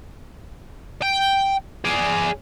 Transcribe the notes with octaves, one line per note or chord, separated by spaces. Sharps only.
G5
G#4 D5